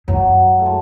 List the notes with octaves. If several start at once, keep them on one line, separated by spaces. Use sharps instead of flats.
F#2 F#3
A3
G#3